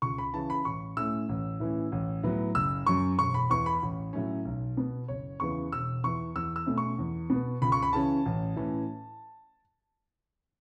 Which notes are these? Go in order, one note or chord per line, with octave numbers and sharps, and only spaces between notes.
C#2 C#6
B5
C#3 E3 C#4 A5
B5
A1 C#6
A2 A3 C#4 E6
A1
A2 E3 C#4
A1
A2 F#3 B3
F#1 E6
F#2 F#3 C#4 C#6
E1 C#6
B5
E2 E3 C#6
B5
A1
A2 F#3 A3 C#4
B1
B2 B3
F#1 C#5
E2 C#3 E3 B3 C#6
E1 E6
E2 E3 C#6
E2 E6
E6
B2 A3 C#4
C#6
E2
B2 B3
C#2 B5
C#6
B5
C#3 E3 C#4 A5
A1
A2 E3 C#4